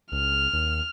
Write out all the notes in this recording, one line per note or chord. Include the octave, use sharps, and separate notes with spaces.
C#2 F6
D#2